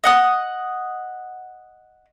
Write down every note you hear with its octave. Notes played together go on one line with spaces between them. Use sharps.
D#5 F#5 D#6